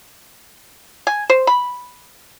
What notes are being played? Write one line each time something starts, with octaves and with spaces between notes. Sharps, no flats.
G#5
C5
B5